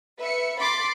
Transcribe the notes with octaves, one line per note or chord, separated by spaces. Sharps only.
B4 E5 C#7
B5 C6 D6 A6 C7